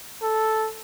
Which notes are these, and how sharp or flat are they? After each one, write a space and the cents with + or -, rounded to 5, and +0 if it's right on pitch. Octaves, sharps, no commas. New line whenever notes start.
A4 -5